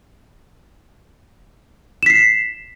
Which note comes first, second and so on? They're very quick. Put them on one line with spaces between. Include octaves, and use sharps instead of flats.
E7 B6 C7